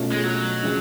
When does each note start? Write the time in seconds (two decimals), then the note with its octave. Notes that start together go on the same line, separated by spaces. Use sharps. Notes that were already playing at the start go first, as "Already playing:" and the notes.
Already playing: B2 A3 C#4 F4
0.12 G#3
0.24 F#3
0.63 C#3 F3 G#3